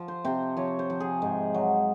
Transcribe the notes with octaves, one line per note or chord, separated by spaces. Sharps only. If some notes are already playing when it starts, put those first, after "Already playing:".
Already playing: F3
C5
C3 C5
F3 C#5
C5
F3
G#4
G#2
F#3